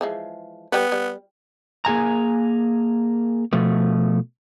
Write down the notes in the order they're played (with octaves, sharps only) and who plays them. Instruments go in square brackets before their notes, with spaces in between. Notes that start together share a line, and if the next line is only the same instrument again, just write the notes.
[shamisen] E3 F3 G#3
[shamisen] G3 B4 [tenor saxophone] B3
[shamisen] G3
[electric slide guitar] A#3 G#4 G#5 A#5
B2 F3 A3